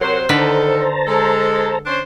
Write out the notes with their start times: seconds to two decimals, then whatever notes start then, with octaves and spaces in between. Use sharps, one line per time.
0.01 C3 F#3 A#4 C5 C#5 F#5
0.29 D3 D#3 A4 B4 C5 A5 A#5
1.07 G#3 A4
1.86 C#4 D4 C5